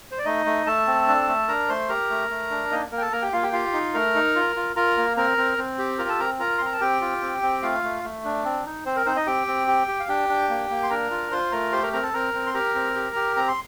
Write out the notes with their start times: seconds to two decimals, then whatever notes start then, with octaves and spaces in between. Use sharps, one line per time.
0.11 C5
0.18 D5
0.25 A3 D#4 D#5
0.46 A3
0.66 A3 A4 A5
0.87 C4
1.08 D4
1.28 A3
1.48 D4 A#4 A#5
1.69 A3 C5 C6
1.89 G4 A#4 A#5
2.10 A3
2.30 A3
2.51 D4
2.71 A#3 D#4 D#5
2.92 A#3 A#4
2.97 G5
3.02 A4 A5
3.12 A#3 A#4 A#5
3.22 G4 G5
3.33 A#3 F4 F5
3.43 G4 G5
3.53 F4 G4 F5
3.73 D#4
3.94 A3 A#4 A#5
4.15 D#4
4.35 F4
4.56 F4
4.76 F4 A#4 A#5
4.97 A#3
5.17 C4 A#4 A#5
5.38 C4
5.58 C4
5.79 G4
5.99 F4 A#4 A#5
6.09 A4 A5
6.19 C4 A#4 A#5
6.40 F4 A#4 A#5
6.58 C6
6.61 C4 A#5
6.73 A5
6.81 C4 G4 G5
7.01 F4
7.21 C4
7.42 C4
7.62 A3 F4 F5
7.83 A3
8.04 A3
8.25 D4
8.45 C4
8.65 D#4
8.86 C4 C5
8.96 A#4
9.06 C4 D#4 C5
9.16 D#4 D#5
9.26 C4 G4 G5
9.47 C4
9.68 G4
9.88 G4
10.00 F5
10.08 D4 G4 G5
10.29 D4
10.49 A#3
10.70 A#3
10.83 C6
10.90 D4 A#4 A#5
11.10 F4
11.31 F4 C5 C6
11.52 A3 A#4 A#5
11.72 G4 C5 C6
11.82 A#4 A#5
11.93 C4 A#4 A#5
12.03 A4 A5
12.13 C4 A#4 A#5
12.34 C4
12.46 C6
12.54 G4 A#4 A#5
12.75 C4
12.95 G4
13.16 G4
13.36 C4 A#5
13.48 C6